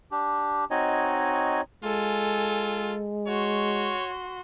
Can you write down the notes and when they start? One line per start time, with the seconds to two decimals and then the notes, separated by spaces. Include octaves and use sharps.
0.11 D4 G4
0.71 C4 D#4 F#4 C#5 D#5 G#5
1.84 G#3 F4 A4 G#5
3.28 F#4 C#5 C6